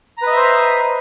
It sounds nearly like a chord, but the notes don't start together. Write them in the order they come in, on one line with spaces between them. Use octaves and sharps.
A#5 B4 D#5 E5 C5